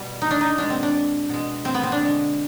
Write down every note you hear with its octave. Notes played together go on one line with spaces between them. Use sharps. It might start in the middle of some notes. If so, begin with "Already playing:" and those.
Already playing: B2 G3
D#4
D4
D#4
B2 G#3 D4
C4
D4
B2 G#3
C4
B3
C4
D4
D3 G#3